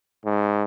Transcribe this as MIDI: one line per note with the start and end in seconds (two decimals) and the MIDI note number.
0.25 0.64 44